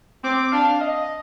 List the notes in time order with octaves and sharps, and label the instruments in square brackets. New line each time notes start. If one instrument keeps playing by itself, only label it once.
[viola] C4 [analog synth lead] D6
[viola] D4 [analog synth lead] F5
[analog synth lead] D#5